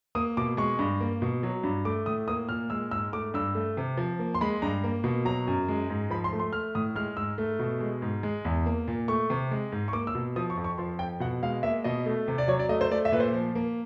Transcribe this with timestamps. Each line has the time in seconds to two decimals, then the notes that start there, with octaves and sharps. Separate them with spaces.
0.15 A#3 D#6
0.37 B2 D6
0.57 G#3 C#6
0.79 G2
1.00 A#3
1.22 B2
1.43 F#3
1.64 G2
1.85 A3 D6
2.06 A2 D#6
2.28 A#3 D#6
2.49 A#2 F6
2.70 G#3 E6
2.91 G#2 E6
3.13 A3 D6
3.34 G2 E6
3.55 A3
3.77 C3
3.97 F3
4.19 A#3
4.34 C6
4.41 G#3 B5
4.62 G2 A#5
4.84 A#3
5.04 B2
5.25 F#3 A#5
5.47 F#2
5.68 G#3
5.90 G#2
6.10 F3 B5
6.24 C6
6.32 A3
6.39 C6
6.53 A3 F6
6.75 A2 D#6
6.95 G#3 F6
7.17 G#2 E6
7.38 A3
7.59 B2
7.80 G#3
8.02 G#2
8.23 G#3
8.45 E2
8.66 A#3
8.88 A#2
9.08 A3 C#6
9.30 C3
9.51 G#3
9.72 G#2
9.88 C#6
9.93 A#3 D6
10.07 E6
10.15 B2
10.36 F3 D#6
10.50 C#6
10.57 F2
10.64 C#6
10.78 F3 C6
10.99 F2 G5
11.20 B2 F#5
11.43 G#3 F5
11.63 A#3 E5
11.84 B2 D#5
12.06 A3
12.28 C3
12.38 D5
12.48 F#3 C#5
12.59 D5
12.69 A3 D#5
12.81 C5
12.91 A3 D5
13.05 E5
13.12 A#2 B4
13.20 C5
13.33 F3
13.55 A#3